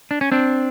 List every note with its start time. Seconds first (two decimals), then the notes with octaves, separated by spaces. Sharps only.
0.11 D4
0.21 C#4
0.32 C4 D4